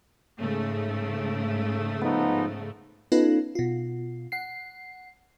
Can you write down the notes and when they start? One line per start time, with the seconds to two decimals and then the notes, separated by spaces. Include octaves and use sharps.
0.41 G#2 C#3 A3
2.03 F3 B3 D#4
3.12 B3 C#4 D#4 F4 A4 B4
3.55 B2 F4
4.32 F#5 C7